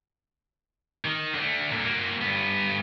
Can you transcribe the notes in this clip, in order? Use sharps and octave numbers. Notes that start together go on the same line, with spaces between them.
D#3
D3 A3
A#2 D3
A#3 F#4
G2 B3